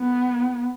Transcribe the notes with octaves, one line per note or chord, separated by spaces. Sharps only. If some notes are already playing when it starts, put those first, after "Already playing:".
Already playing: B3